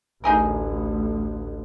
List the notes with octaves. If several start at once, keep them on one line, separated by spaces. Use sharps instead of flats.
A1 D2 D#4 G#4 A#4